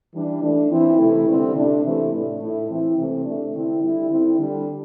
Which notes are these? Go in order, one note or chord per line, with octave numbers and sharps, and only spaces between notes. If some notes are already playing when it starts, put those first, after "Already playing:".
E3 G3 D4
E3 A3 D4
E3 C4 E4
C3 E3 A3 E4
D3 G3 C4 E4
C3 A3 D4
C3 E3 A3 C4 E4
A2 A3 D4
A2 A3 E4
E3 C4 E4
C3 E3 A3 C4
C3 A3 D4
D3 C4 E4
D3 G3 E4
D3 C4 E4
D3 G3 D4